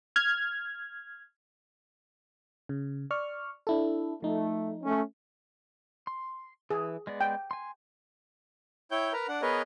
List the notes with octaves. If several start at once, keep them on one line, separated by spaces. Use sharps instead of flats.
F6 G#6
C#3
D5 C#6 F6
D4 E4 A4
F3 A3 D#4
A3 C#4
C6
E3 G#4
G#3 B3 D5
G5
G#5 C6
E4 C#5 G5 G6
A#4 B4 A#5
D4 F#5
B3 G#4 A#4 B4 C#5 D#5